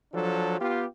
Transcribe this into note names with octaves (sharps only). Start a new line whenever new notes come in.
F3 F#3 D4 A4
B3 F4 G4